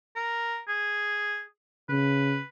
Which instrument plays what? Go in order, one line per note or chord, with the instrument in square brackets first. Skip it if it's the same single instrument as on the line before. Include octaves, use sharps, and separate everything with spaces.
[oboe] A#4
G#4
[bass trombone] C#3 [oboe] B4